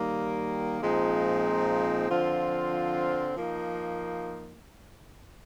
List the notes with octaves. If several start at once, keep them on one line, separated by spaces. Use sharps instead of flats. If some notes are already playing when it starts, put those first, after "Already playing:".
Already playing: D#3 G3 A#3
A#2 F3 G#3 C4 D#4
D3 F3 C4 F4
F3 A#3 D#4